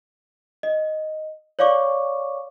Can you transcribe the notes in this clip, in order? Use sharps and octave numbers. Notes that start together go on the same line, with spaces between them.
D#5
C#5 D5 F5 C#6 D6